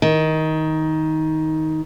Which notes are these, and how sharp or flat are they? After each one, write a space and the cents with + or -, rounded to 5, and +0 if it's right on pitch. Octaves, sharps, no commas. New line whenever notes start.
D#3 +15